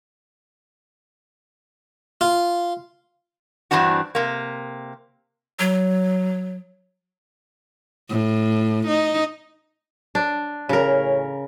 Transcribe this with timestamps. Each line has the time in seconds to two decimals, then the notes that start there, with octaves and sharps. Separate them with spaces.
2.21 F4
3.71 G2 B2 E3 C4 D4 F#4
4.15 C3 A#3
5.59 F#3
8.09 A2
8.87 D#4
10.15 D4
10.69 A1 C#3 C#4 A#4 C#5